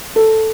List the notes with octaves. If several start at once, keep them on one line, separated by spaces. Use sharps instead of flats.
A4